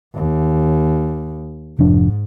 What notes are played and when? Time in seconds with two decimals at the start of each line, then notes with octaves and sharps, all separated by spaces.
0.15 D#2
1.79 F1 G#2 F3 D4